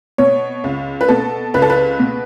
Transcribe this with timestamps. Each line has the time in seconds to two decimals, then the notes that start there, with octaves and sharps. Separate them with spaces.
0.18 B2 C#5
0.64 C#2
1.01 B4
1.08 B2 A4
1.54 C#2 B4
1.62 A4
1.70 B4
1.99 B2